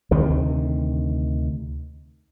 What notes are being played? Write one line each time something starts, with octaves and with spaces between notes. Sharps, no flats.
D2 C3 D#3